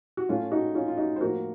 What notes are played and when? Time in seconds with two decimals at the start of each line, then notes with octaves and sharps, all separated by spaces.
0.17 F#4
0.29 A2 A3 C#4 F4
0.52 D#4 F#4
0.75 C#4 F4
0.88 F4
0.97 D#4 F#4
1.16 C5
1.21 A2 F3 A#3 F#4 A#4